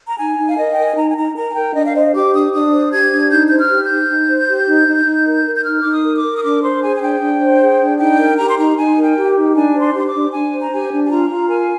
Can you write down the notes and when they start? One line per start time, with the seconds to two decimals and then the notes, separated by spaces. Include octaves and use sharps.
0.08 A#5
0.18 D#4 G#5
0.38 D#4
0.47 F5
0.57 A#4 D#5
0.72 G5
0.78 A#4
0.84 G#5
0.96 D#4 A#5
1.09 G#5
1.16 D#4 A#5
1.35 A#4 A#5
1.50 G#5
1.55 A#4 G5
1.74 D4 D#5
1.86 F5
1.94 C5 D#5
2.13 G4 D6
2.33 D4 D#6
2.53 D4 D#6
2.72 C5
2.91 G4 G#6
3.12 D4
3.30 D#4 G6
3.47 C5 G6
3.57 F6
3.70 G4
3.83 G6
3.90 D#4
4.08 D#4
4.28 C5
4.48 G4
4.67 D#4
4.87 D#4
5.06 D#4
5.26 A#4
5.45 A#4
5.55 G6
5.64 D#4 F6
5.80 D#4 D6
5.91 D#6
6.04 A#4
6.17 D6
6.23 A#4
6.37 D#6
6.43 D4 D6
6.62 C5 C6
6.81 G#4 G#5
6.96 G#5
7.01 D4 G5
7.20 D4
7.40 C5
7.60 G#4
7.79 D4
7.98 D#4 G5
8.18 A#4
8.37 G4 A#5
8.48 C6
8.58 D#4 A#5
8.77 D#4 G#5
8.96 A#4
9.03 G5
9.16 G4
9.35 D#4
9.55 D4 G#5
9.75 C5
9.81 C6
9.94 G4
9.99 C6
10.07 D6
10.14 D4
10.32 D4 G#5
10.53 C5
10.61 A#5
10.72 G4 G#5
10.91 D4
11.06 G#5
11.10 F4 A#5
11.30 F4
11.49 A#4 G#5